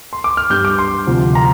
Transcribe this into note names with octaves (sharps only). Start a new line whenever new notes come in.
C6
D6
F6
G2 G3 G6
D6
C6
D2 C3 F3
A#5